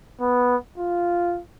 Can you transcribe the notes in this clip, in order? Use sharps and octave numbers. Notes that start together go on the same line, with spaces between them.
B3
F4